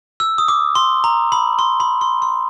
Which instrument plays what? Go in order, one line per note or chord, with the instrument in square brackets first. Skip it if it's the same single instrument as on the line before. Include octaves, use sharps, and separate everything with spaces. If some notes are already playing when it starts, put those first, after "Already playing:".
[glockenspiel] E6
D#6
D6
C6
A#5
B5
C6
B5
C6
C6